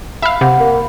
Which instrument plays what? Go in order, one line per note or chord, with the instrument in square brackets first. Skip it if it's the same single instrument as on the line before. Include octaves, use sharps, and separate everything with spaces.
[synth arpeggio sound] E5 F5 [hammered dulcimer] B5
[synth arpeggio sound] C3 [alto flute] F#5
[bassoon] A#3